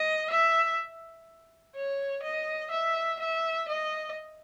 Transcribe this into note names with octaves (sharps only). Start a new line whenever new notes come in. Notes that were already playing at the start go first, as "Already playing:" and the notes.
Already playing: D#5
E5
C#5
D#5
E5
E5
D#5